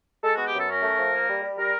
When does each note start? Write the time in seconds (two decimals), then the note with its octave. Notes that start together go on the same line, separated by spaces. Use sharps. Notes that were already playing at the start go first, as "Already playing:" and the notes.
0.23 G#3 A4
0.34 B3 F#4
0.45 G4
0.54 F#2 A4
0.68 C#4 A#4
0.83 A3
0.98 F3
1.13 A#3
1.28 G3
1.42 G3
1.58 G3 A#4